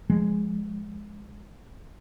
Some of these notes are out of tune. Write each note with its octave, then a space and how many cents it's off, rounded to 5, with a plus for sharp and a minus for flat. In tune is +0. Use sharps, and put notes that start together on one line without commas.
F3 +0 G#3 +0